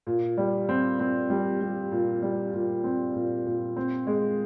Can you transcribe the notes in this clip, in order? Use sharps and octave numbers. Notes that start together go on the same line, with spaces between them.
A#2
G3
C4
C4
G3
G3
A#2
G3
A#2
C4
A#2
A#2
C4
G#3